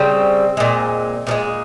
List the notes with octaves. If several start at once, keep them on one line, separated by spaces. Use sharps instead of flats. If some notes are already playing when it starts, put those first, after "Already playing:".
Already playing: C#3 G3 C4
A#2 G#3
A#2 F3 G#3